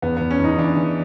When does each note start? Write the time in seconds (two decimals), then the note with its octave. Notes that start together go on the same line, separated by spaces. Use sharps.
0.02 E2 B3
0.17 E2 B3
0.30 C#4
0.40 E2 D#4
0.58 E3 D4
0.77 E3